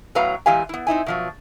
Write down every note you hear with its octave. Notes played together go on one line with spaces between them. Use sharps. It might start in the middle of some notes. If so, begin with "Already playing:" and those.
A2 F#3 B3 B4 F5 A#5
A#2 E3 G#3 G4 F5 G#5
B3 E4
C4 D#4 E4 G#5
B2 F3 F#3